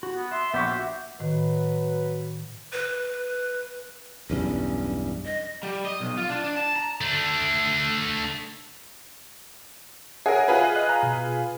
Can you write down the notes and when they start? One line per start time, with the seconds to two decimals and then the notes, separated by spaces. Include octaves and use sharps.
0.03 F#4
0.16 B3
0.31 E5 C6
0.54 A#1 B3 G4 E5 C#6
0.66 F#4 E5
1.20 A2 D#3 F#3 F#4 B4
2.73 B4
4.30 B1 E2 G2 C#4
5.24 D#5
5.63 G3
5.86 D#5
6.00 B1
6.17 F4
6.30 D4
6.44 D4
6.56 A5
6.76 A#5
7.01 A3 D4
10.26 G#4 A#4 C#5 E5 F#5
10.48 F4 G#4 B4
10.76 D#5 F#6
10.89 A#5
11.03 B2